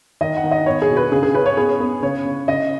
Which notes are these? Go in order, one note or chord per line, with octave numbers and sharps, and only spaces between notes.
D#3 D#5
F#5
D#3
D#5
B3 C#5
G#4
B2
B4
C#3 G#4
G#4
C#4 B4
C#5
B3 G#4
B3
C#3 C#5
C#3
C#3 D#5